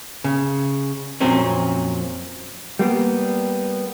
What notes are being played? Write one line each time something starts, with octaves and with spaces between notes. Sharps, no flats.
C#3
F2 A#2 F#3 C4 C#4
G3 A#3 B3